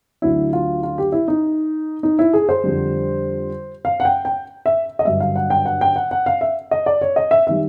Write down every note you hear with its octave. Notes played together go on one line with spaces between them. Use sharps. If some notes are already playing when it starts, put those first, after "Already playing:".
D2 D3 F#3 E4
F4
F4
G4
E4
D#4
D#4
E4
G#4
C5
F2 D3 G3
F5
F#5
G5
G5
E5
D#5
G2 D3 F#3 E5
F5
F#5
G5
F#5
G5
F#5
F#5
F5
E5
D#5
D5
C#5
D#5
E5
D#3 G3 E5